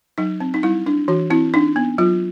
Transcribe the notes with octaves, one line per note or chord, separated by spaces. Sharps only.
F#3 D#4
C4
D#4
G3 E4
D4
E3 F#4
C4 E4
D4 D#4
B3
F#3 F4